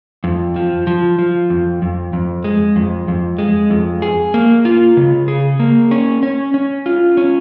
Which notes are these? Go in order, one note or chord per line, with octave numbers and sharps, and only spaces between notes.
F2
F3
F3
F3
F2
F2
F2
G#3
F2
F2
G#3
F2
G#4
A#3
F4
C#3
G#4
A#3
C#4
C#4
C#4
F4
C#4